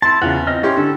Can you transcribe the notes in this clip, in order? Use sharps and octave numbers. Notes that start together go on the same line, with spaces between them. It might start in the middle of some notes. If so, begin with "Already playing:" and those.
E4 A5 C6
E2 C#3 F4 F#5
C4 D#5 F6
C#4 E4 G4 C6
D3 A4